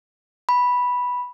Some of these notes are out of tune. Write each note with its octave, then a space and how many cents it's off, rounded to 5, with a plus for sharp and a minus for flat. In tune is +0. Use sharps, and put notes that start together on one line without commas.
B5 -5